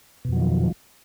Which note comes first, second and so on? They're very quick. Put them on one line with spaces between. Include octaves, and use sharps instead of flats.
B2 F2 F#3 D#3 F3